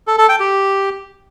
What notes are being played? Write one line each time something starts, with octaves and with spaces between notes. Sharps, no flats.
A4
A4
G5
G4